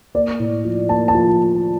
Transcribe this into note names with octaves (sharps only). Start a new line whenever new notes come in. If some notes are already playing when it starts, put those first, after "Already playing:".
A#3 D5
A2
F3
A#3 A5
A5
F3